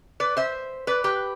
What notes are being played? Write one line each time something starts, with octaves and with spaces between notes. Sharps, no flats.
B4 D5
C5 E5
B4 D5
G4 B4